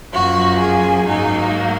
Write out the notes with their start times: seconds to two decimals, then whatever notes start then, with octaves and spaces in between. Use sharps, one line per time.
0.13 F#2 F3 A#3 F#4
0.61 G#4
1.07 G#2 F#3 A#3 D#4